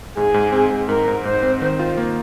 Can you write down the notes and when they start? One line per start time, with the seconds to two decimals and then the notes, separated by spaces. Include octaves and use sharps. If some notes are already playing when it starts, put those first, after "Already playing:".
0.17 G#2 G#4
0.34 G#2
0.52 C4
0.70 G#2
0.88 G#2 A#4
1.08 G#2
1.25 G#2 C5
1.43 C4
1.61 D#3 C5
1.79 F4
1.97 A#3